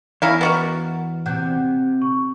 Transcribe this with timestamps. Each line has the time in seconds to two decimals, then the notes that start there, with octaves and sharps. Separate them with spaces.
0.22 E2 C#4 E4 F5 A#5 A#6 B6
0.41 B3 F#4 A#4 D#5 A6
1.26 C3 F#5 F#6 G6
2.02 C#6